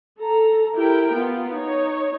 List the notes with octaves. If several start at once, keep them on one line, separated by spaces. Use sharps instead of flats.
A4 A#5
E4 G4 A#4 G5
B3 F4
D#4 C#5